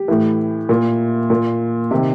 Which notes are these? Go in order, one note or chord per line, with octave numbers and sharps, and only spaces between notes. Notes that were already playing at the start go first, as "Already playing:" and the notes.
Already playing: G4
A2 E3
A#2
A#2
C3 D#3 G4